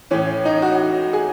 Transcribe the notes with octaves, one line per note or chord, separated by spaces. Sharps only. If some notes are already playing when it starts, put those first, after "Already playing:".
A2 E3 C#4
D#4
F#4
G#4